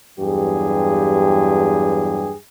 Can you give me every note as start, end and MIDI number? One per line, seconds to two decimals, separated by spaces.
0.19 2.34 40
0.19 2.34 43
0.19 2.34 54
0.19 2.34 67
0.19 2.34 68